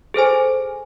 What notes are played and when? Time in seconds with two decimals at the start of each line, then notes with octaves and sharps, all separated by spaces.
0.14 G#4 A4 C5 G#5